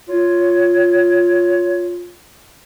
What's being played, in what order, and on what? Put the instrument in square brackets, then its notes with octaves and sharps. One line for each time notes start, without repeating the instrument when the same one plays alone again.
[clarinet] F4 [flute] C#5